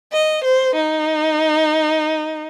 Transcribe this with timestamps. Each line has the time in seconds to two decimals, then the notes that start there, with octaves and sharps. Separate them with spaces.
0.13 D#5
0.45 C5
0.75 D#4